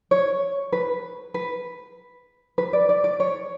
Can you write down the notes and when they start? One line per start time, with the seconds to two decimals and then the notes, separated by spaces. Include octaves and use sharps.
0.11 C#5
0.72 B4
1.34 B4
2.58 B4
2.73 D5
2.89 D5
3.04 D5
3.20 C#5